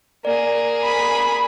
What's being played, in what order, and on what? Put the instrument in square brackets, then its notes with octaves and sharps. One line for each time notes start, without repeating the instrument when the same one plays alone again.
[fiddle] A#3 G#4 [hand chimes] D5
[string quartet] B5